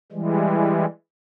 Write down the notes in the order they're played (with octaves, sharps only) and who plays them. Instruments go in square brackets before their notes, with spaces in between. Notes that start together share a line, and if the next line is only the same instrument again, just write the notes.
[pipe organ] E3 G3 G#3